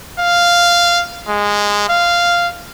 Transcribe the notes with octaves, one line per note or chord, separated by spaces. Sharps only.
F5
G#3
F5